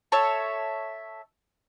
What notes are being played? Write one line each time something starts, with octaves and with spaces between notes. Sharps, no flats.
A4 C#5 E5